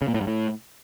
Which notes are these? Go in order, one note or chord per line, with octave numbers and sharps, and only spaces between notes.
C#3
A#2
A2
G2
A2